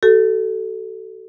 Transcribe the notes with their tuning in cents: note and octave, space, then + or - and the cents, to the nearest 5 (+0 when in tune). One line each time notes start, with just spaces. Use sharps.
F#4 +40 A4 +0